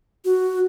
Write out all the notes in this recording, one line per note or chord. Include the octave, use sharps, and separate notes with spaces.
F#4